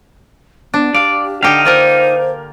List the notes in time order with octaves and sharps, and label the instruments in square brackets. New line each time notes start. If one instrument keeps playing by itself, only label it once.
[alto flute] B3 [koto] D4
[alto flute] G4 [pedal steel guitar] D5 [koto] F5
[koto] D3 G4 [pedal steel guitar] D#4 F5 [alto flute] G5
[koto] A#3 F4 A#4 [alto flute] C5